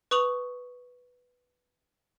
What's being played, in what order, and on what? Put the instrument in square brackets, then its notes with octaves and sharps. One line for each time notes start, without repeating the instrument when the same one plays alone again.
[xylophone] B4 C#6 D#6 F7 F#7